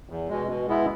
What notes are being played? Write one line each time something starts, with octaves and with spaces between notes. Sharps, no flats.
E2
B2 G#3
B2
G#3 B3 E4